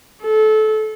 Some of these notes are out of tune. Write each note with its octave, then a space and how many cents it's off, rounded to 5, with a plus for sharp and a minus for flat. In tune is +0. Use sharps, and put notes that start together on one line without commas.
A4 -25